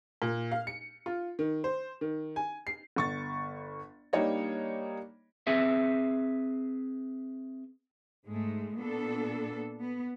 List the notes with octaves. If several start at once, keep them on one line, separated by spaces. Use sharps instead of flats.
A#2
F5
C#7
F4
D#3
C5
D#3
G#5
C7
G1 C#6 A6
G3 A#3 D4 D#4 C#5 D#5
C4 G#4 B4 E5
G#2 G#3 A3
A#2 B3 D4 A4
B3